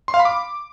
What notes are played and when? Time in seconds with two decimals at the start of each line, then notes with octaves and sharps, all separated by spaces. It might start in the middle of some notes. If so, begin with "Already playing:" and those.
0.08 C6
0.14 F5
0.20 B5
0.25 D6